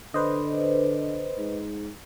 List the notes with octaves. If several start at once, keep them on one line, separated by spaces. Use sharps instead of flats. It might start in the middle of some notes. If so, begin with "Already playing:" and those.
D3 B4 C5 D#5
G#2